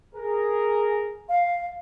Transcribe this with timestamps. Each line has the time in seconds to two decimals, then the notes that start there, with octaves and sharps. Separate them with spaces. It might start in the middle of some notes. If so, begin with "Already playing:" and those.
0.15 G#4 A#4
1.29 F5